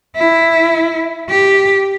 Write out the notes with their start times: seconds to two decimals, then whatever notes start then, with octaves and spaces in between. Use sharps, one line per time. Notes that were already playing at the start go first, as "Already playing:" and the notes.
0.17 E4
1.30 G4